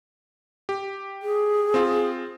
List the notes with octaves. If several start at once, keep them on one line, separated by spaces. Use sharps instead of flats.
G4
G#4
C4 F4